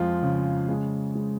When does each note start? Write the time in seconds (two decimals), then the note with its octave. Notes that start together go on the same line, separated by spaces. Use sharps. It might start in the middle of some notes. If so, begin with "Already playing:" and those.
Already playing: F2 F3 G#3 F4
0.23 C#3
0.69 G#3
1.15 G#3